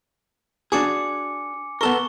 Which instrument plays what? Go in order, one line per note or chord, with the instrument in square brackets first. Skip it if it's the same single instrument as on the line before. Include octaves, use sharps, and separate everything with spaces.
[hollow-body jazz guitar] D4 F#4 G#4 [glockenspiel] G#5 D6 C#7
[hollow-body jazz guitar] B3 A4 A#4 [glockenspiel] C#6 G7